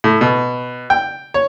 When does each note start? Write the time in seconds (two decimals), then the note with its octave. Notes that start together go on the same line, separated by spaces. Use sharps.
0.04 A2
0.21 B2
0.90 G5
1.34 C#5